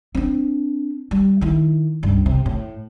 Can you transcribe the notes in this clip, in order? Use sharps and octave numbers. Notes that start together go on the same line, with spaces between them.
C4 D4
G3
D#3 E4
C#2 G2
C3
A2